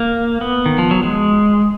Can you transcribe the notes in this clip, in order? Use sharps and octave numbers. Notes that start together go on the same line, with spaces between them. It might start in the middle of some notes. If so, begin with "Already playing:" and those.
Already playing: A#3
B3
D#3
F3
F#3
G#3